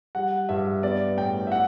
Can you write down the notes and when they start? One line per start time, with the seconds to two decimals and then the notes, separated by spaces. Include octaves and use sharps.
0.15 G3 F#5
0.49 G2 E5
0.83 B3 D5
1.17 A2 G5
1.47 E5
1.52 F#5